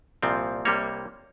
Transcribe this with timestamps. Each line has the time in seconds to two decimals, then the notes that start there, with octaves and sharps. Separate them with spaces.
0.23 C2 A#2 F3 C4
0.65 C2 C3 G3 A#3 C#5